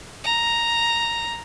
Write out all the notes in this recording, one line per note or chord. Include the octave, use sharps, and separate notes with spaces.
A#5